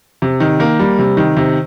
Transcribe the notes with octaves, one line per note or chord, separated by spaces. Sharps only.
C3
D#3
A#3
G3
C3
D#3
C3